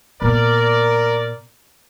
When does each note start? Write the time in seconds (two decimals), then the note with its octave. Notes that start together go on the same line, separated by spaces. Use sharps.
0.22 A#2 B3 A#4 D5